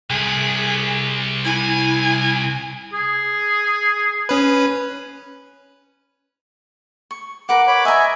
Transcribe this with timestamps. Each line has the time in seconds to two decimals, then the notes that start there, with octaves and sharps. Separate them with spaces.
0.10 C2 G#4 B6
1.45 E4 G#5
2.93 G#4
4.29 C#4 B4
7.11 C#6
7.49 A#4 B4 F#5 D6
7.67 C#5 B5 D6
7.85 D#5 E5 G#5 A#5